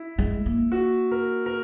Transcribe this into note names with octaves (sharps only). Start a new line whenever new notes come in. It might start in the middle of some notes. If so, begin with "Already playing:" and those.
Already playing: E4
G#3
A#3
F#4
A#4
A#4